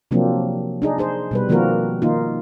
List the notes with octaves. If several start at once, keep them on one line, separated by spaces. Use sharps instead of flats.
C3 F3 F#3 A#3 C4 D4
D4 D#4 G#4
D#4 G#4 C5
B2 G3 B4
D#3 F3 A#3 C4 F#4 A#4
D#3 A#3 D#4 F4